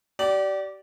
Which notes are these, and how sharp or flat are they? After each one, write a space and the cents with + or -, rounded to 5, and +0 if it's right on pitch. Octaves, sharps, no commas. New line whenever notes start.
G4 -35 D5 -10